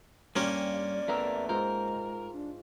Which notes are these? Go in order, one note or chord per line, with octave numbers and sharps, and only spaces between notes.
G2 A#3 C#4 G4 D5 C6
E2 A3 A#4 A#5 E6
G#2 G#3 F4 A#4 G6
D4